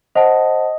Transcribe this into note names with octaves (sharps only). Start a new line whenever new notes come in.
C5 D#5 F#5 A5